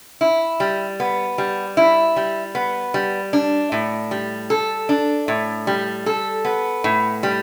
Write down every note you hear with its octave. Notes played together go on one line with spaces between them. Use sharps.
E4
G3
B3
G3
E4
G3
B3
G3
D4
A2
G3
A4
D4
A2
G3
A4
B3
A2
G3